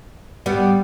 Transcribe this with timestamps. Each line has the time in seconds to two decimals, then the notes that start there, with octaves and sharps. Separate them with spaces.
0.46 G3 B3